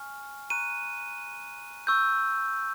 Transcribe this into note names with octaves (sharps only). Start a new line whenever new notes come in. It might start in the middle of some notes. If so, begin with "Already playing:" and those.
Already playing: G#5 C#6 F6
A#5 C#6 F#6 D#7
C#6 E6 G6